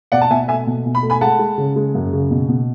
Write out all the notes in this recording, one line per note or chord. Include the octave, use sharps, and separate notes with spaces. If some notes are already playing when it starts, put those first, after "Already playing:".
B2 D5 F#5
A5
B2 E5 G#5
A3 E5 G#5
B2
B2
B5
A3
G#5 B5
G#3 F#5 A5
G#3
C#3
G#3
F#2
C#3
B2
B2